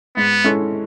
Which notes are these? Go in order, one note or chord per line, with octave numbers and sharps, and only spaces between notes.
G#2 B3
G#3 C#4 E4 A4